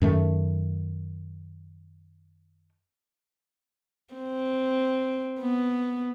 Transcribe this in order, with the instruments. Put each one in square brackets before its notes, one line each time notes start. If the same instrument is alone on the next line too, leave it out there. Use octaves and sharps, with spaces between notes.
[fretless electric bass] F#2 D#3 A3
[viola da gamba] C4
B3